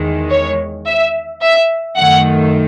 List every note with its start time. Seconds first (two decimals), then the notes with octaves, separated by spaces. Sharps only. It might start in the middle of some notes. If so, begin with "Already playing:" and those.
Already playing: E2 D#3 G#3
0.30 C#5
0.86 E5
1.42 E5
1.97 F#2 D#3 A3 F#5